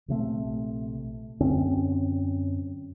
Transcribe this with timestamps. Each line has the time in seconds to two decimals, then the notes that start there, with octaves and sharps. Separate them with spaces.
0.08 A#1 C3 A3
1.40 F#2 D3 C4 C#4